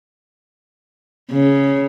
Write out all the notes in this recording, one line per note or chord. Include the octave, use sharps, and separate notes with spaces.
C#3